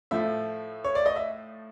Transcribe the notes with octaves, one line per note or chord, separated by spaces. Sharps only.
A2 F3 A3 E5
C#5
D5
D#5
E5